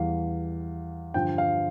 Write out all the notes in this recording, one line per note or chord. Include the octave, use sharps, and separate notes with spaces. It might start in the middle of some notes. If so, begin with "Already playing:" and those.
Already playing: E2 E3 G3 F5
G2 D3 F3 G5
F5